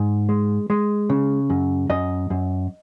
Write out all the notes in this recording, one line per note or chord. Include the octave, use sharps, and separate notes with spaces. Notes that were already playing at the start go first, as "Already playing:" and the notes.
Already playing: G#2
G#3
G#3
C#3
F#2
F#2 D#5
F#2